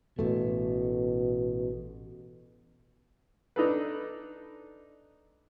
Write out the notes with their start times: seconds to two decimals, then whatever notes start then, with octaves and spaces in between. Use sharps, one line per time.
0.19 A1 B2 A3
3.56 D4 D#4 A4 B4